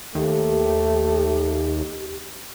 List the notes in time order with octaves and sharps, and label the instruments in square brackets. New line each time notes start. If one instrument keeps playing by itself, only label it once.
[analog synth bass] D#2 [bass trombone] A3 [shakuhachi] G4